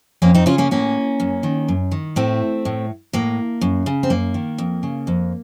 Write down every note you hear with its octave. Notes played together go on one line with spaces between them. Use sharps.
F2 A#3 C#4
C4 D#4
C#3 C#4 F4
A#3 C#4
A2 A#3 C#4
F#2
D#3
F#2
D#3
A2 A3 C4
A2
A2 A#3
F#2
C#3
C4
F#2 A#3
D#3
F2
C#3
F2